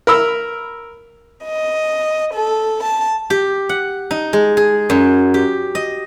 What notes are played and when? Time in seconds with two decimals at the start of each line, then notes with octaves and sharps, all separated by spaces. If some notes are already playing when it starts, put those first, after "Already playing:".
0.07 A#4 B5 E6
1.45 D#5
2.33 A4
2.83 A5
3.30 G4
3.69 F#5
4.11 D#4
4.33 G#3
4.57 G#4
4.90 F#2
5.34 G4
5.75 D#5